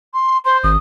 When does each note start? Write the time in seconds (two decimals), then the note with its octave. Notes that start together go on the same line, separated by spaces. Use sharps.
0.13 C6
0.45 C5 C6
0.64 G#1 D#6